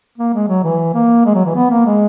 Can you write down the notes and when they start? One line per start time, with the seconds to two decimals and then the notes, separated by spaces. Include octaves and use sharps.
0.18 A#3
0.34 G#3
0.48 F#3
0.64 E3
0.94 A#3
1.25 G#3
1.35 F#3
1.46 E3
1.55 B3
1.71 A#3
1.86 G#3